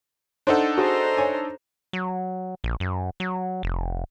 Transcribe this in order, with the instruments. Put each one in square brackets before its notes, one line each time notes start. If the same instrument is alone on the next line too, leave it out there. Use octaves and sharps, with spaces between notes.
[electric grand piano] D4 D#4 A4 [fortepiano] C5 F#5
[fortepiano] F#4 G#4 [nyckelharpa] C5 A#5
[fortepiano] C#5 G#5
[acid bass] F#3
A#1
F#2
F#3
F1